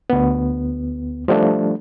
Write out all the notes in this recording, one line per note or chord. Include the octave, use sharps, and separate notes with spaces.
D2 B3
F3 G3 A3 D4